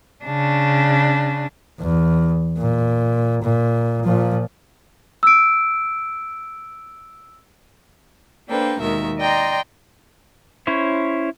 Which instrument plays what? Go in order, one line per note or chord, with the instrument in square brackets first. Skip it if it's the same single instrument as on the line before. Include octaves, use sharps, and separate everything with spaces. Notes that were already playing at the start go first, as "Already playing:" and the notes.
[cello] C#3 D4
[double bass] E2
A#2
A#2
A#2 F3
[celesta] E6 D7
[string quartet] A#3 D4 A4 B4 C5 G5
D#2 B2 D#3 G#3 A#4 E5
D5 D#5 G5 A#5 C6
[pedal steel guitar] C#4 E4 C5 C#5